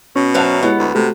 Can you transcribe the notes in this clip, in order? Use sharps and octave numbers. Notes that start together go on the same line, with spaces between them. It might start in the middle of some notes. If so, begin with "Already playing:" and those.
B2 C#4
F#3 C5 E5 F5 A5
G#3 B3 E4 G4 C#5
D2
C3 A3 F#4